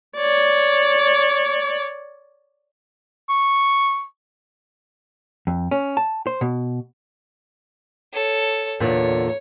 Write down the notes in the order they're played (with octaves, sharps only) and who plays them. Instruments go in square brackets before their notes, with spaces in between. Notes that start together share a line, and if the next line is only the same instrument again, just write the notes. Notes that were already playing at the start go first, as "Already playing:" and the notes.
[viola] C#5 D5
[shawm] C#6
[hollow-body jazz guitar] F2
C#4
A5
C5
B2
[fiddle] A4 C#5
[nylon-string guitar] E2 A#2 D3 [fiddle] C#5